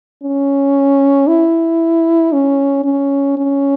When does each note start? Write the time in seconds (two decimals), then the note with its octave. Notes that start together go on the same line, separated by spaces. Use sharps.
0.23 C#4
1.28 E4
2.32 C#4
2.84 C#4
3.37 C#4